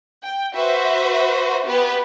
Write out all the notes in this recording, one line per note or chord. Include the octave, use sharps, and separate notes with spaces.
G5
F#4 B4 C5 E5
B3 G4 B4